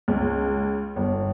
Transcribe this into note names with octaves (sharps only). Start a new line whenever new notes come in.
C#2
G1